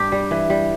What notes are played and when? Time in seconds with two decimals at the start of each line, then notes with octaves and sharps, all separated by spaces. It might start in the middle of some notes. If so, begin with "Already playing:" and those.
Already playing: G2 G4
0.12 G3
0.31 E3
0.50 G3